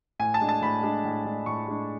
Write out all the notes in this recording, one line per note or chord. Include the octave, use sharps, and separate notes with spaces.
A2 G#5
A5
G#3 D4
A5
A2 B5
G#3 D4
A2
G#3 D4
A2 C#6
G#3 D4